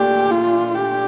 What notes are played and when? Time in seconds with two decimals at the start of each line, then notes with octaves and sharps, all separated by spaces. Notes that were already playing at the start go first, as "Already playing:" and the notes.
Already playing: A#2 A3 D4 G4
0.31 F4
0.74 G4